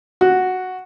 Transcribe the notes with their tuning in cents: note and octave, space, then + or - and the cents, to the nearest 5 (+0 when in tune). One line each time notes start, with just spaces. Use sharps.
F#4 -5